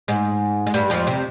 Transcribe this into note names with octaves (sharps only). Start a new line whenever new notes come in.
G#2 G#3
G#3
G2 G3
F2 F3
C3 C4